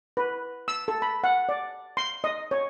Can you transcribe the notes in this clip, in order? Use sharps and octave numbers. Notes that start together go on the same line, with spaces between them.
B4
E6
A4
B5
F#5
D5
C6
D#5
C#5